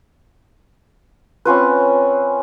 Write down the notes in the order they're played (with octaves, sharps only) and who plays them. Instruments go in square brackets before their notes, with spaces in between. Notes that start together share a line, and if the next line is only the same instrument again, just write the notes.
[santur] C4 C#4 F4 B4